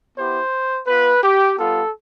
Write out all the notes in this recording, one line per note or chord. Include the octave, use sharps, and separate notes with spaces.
B3 E4 G4 C5
B3 F4 B4
G4
G3 B3 F4 A4